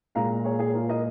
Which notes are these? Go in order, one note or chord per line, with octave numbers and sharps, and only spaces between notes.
A#2 G#3 F5 A#5
G#4 C#5
G#4
F4 A#4
A#4 D#5